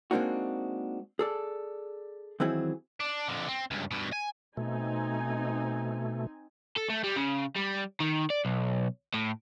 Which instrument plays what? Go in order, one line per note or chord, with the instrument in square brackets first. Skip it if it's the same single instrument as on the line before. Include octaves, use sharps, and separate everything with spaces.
[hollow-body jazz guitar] G#3 A#3 C4 D4 D#4 F#4
G#4 A4 D5
D#3 E3 F#3 C4 E4 G#4
[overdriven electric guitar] D4
F2 D3
C4
C#2 G2
G2 B2
G#5
[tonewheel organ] B2 A3 [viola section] C4 D#4 G#5
[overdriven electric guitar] A4
A3
G3
C#3
G3
D#3
D5
B1
A2